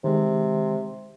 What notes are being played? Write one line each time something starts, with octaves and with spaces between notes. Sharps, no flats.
C3 D#3 G#3